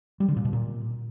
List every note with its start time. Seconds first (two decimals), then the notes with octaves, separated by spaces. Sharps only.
0.20 G3
0.28 D3
0.37 A#2
0.45 B2
0.53 A#2